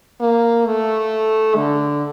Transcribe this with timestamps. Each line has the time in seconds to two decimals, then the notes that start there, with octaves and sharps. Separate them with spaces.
0.20 A#3
0.66 A3
1.56 D3